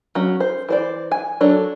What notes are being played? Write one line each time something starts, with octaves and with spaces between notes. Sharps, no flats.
F#3 C#4
C5
E3 C5 D5
G#5
F#3 D4 A4 C#5